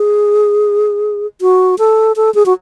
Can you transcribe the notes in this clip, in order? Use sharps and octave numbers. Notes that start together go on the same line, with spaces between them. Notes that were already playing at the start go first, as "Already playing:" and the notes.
Already playing: G#4
F#4
A4
A4
G#4
F#4